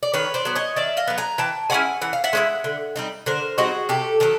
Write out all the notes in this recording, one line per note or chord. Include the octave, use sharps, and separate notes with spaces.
D5
D#3 B4 C#5
C5 D5
F#3 B3
C#5 D#5
D#3 D5 E5
D#5 F5
F#3 B3
G#5 A#5
E3 G5 A5
G#3 C#4 E4 F#5 G#5
E3 F#5
F5
E5 F#5
G#3 C#4 E4
D3
G3 C4 D#4
D3 A#4 C5
G3 C4 D#4 F#4 G#4
C3 G4 A4
D#3 F#3 G4 A4